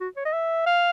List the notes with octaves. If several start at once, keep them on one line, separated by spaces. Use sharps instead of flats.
F#4
C#5
D#5
E5
F5